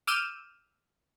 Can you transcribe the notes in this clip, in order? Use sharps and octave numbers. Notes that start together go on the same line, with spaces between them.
D6 E6 F6 G6 D#7 E7